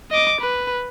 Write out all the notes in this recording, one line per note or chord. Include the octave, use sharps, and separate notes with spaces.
D#5 D6
B4